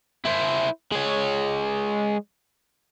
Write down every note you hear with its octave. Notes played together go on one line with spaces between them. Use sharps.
E4 C5
G#3 C#5